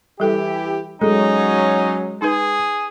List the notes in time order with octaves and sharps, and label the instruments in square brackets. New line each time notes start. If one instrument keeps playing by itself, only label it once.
[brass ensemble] E3 E4 G4 [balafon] G3 A4
[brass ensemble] F#3 C#4 [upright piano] G#3 [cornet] D#4 [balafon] A4
[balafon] D#4 B4 [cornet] G#4